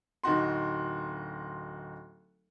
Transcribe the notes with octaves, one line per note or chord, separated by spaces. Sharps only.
D1 D#4 F#4 C6